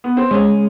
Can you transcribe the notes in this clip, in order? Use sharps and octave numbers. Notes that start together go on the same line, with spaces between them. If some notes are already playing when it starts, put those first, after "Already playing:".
B3
C4
G#3 C#4